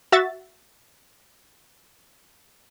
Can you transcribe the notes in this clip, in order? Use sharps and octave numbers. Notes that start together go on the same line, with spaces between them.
F#4 E5 A6